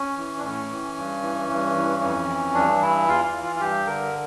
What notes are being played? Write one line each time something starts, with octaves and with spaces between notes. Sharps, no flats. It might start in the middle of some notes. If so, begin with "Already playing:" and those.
Already playing: C#4
E3
D4
A2 C#4
E3
G2
E3
G2
E3
F2
E3
G2 D4
E3 E4
E2 F4
F4
E3
F4
F4
G2 G4
D3 A#4